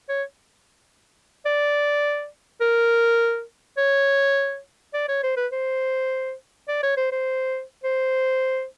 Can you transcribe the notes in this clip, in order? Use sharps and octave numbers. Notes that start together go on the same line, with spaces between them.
C#5
D5
A#4
C#5
D5
C#5
C5
B4
C5
D5
C#5
C5
C5
C5